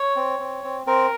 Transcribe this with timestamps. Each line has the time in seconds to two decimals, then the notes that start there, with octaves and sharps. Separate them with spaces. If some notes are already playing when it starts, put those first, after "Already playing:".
Already playing: C#5
0.16 C4
0.40 C4
0.64 C4
0.87 C4 A#4